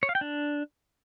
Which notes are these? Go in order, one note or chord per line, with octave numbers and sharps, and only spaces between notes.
C#5
F5
G5
D4